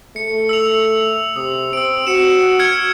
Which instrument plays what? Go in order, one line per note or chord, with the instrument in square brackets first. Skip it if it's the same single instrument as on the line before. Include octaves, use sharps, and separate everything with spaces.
[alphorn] A3 [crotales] C#7
[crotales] E6 C#7 F7
[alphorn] C3 [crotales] D#6
[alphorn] C4 [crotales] E6 D7
[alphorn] F#4 [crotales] C#7 E7
[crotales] F6 G#6 C#7